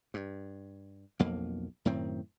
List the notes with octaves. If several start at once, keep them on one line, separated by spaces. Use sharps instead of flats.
G2
B1 F2 A#3
F#2 A2 D#3 C4